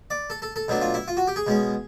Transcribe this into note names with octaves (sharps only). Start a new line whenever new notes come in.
D5
A4
A4
A4
B2 F#3 A3 D4
F4
E4
F4
F#4
G4
G#4
B2 G#3 C#4